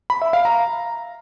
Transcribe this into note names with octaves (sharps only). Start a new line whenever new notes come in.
B5
E5
F5
A#5